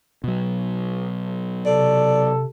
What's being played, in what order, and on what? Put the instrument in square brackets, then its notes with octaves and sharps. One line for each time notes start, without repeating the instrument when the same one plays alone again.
[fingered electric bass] B2 F#3
[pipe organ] C3 [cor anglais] A4 [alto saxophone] D5